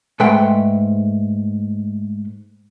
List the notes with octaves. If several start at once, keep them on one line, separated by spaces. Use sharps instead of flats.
G#2 A3 B4 F#5 G5 C6